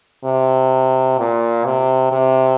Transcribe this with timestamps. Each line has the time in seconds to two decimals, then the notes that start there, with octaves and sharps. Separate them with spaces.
0.25 C3
1.18 A#2
1.65 C3
2.12 C3